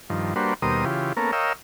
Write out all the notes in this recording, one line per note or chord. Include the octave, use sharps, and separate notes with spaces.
G2 D#3 F3
G3 A#3 D4 F#4 B4 C5
D#2 B2 G3 A#4 C5 D#6
C#3 E3 F4 G4
A#3 B3 C#4 A4 A#4
A#4 C#5 D#5 F5 G5 E6